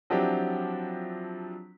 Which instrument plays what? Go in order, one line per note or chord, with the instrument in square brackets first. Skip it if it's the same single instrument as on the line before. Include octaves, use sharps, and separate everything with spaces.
[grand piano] F3 F#3 C4 D4 E4 G4